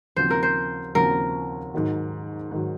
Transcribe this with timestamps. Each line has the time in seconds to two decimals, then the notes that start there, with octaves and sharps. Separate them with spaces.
0.16 D#2 C#3 F3 C4 F#4 C5
0.30 A#4
0.43 C5
0.95 D#2 C#3 F3 C4 F#4 A#4
1.74 G#2 D#3 F#3
2.51 G#2 D#3 F#3